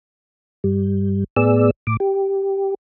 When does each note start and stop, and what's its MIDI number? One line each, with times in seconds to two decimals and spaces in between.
0.64 1.24 43
0.64 1.24 55
1.36 1.71 45
1.36 1.71 59
1.36 1.71 68
1.36 1.71 74
1.36 1.71 88
1.87 1.97 45
1.87 1.97 86
2.00 2.74 67